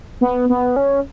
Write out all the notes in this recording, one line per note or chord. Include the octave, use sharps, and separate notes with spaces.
B3
B3
C#4